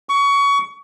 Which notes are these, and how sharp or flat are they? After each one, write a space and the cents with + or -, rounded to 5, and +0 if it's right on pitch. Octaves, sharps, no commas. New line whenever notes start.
C#6 +25